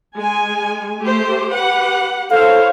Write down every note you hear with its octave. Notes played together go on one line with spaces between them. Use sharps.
G#3 G#5
A3 G4 C5
G4 B4 F#5
E4 A4 C5 C#5 F5